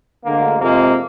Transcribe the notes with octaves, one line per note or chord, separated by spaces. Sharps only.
D2 D3 G#3 A#3
F2 C3 F3 G#3 A#3